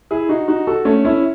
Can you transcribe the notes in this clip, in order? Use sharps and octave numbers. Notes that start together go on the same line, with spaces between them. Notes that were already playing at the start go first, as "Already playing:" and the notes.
E4 G#4
D#4 F#4
D#4 F#4
F#4 A4
A3 C#4
C#4 E4